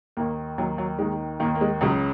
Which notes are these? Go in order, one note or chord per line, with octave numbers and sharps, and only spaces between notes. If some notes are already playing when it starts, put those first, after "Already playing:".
D#2 D#3 A#3
D#2 D#3 F#3
F#3
D#2 D#3 G#3
D#2 D#3 A#3
A#3
G#3
C#2 C#3 F#3